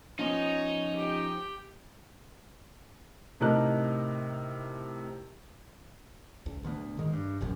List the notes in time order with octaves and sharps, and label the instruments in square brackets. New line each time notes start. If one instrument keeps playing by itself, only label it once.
[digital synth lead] F3 [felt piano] B3 C#4 [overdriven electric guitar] D#4 [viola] C#5
[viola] G4 G5
[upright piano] A2 C3 D#4 A#4 A5 F#6
[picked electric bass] C#2
D1 D2 D3 B3
G#2 D#3 G#3
G2
E1 A#1 F#2